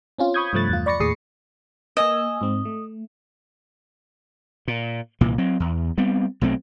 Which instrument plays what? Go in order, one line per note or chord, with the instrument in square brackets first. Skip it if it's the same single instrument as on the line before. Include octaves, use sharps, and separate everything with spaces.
[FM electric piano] C4 C#4 F4
B5 C#6 D#6 G6 G#6
G2 C3 F3 A3 F#6 A6
E2 F4
D5 B5 C#6 A6 A#6 C#7
D#2 A2 G#4 D#6 C7 C#7
[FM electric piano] A#3 G#5 E6 [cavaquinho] D#5
[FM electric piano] G#2 C4
A3
[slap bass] A#2
C2 A#2 E3
F#3 C4
E2
G3 B3 C4
B1 F#3 A3 C4